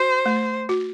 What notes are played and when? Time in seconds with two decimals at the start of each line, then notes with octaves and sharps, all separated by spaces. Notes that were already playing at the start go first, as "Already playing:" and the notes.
Already playing: F#4 C5
0.26 A3
0.69 F#4